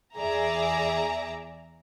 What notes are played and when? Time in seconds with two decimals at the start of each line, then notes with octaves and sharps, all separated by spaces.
0.16 E2 G#4 D5 E5 A#5